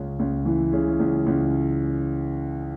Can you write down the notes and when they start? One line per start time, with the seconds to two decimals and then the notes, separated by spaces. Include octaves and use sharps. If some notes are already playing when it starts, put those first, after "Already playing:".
Already playing: C#2 C#3
0.19 C#2
0.45 E3
0.73 C#3
0.99 C#2
1.26 C#2